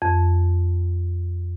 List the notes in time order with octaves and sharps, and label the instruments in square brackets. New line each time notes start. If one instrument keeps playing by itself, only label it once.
[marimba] F2